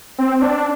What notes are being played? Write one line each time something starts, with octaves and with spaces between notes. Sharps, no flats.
C4
C4
D4